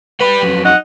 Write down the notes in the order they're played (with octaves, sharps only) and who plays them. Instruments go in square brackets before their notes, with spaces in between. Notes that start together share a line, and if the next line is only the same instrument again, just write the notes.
[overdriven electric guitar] G3 B5 [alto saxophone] B4
[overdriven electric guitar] F2 F#3
[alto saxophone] D#4 [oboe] F#5